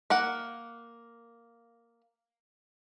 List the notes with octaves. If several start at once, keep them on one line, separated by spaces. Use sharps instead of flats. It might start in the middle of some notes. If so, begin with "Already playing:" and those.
A#3 A#4 F#5